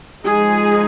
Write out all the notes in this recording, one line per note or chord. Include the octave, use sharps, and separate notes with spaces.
F3 G#3 D#4 G#4